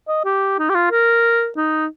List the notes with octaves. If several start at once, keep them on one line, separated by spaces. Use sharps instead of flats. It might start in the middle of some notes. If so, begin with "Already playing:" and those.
D#5
G4
D#4
G4
F4
A#4
D#4